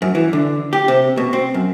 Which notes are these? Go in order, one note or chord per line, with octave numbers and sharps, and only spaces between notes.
F#2
E3
D3
G4
C3
B2
C4
F#2